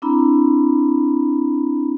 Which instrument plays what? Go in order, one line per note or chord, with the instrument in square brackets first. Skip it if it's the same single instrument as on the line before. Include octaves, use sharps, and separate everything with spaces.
[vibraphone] C4 D4 E4 A#5 B5